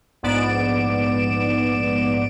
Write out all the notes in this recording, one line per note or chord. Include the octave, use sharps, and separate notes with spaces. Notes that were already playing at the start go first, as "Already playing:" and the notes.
A#1 G#2 B3 D5 D7 E7